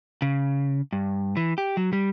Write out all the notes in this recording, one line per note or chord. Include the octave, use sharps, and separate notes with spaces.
C#3
G2
E3
G4
F#3
G3